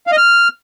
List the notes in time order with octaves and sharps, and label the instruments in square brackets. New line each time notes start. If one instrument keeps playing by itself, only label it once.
[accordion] F5
D#5
F6